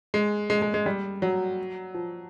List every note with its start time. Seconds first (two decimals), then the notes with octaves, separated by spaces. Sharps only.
0.14 G#3
0.50 G#3
0.62 G#3
0.74 G#3
0.86 G3
1.22 F#3
1.94 F3